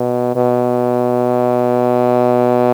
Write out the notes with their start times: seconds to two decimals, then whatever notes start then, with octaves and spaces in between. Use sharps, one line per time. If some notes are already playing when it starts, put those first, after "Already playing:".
Already playing: B2
0.36 B2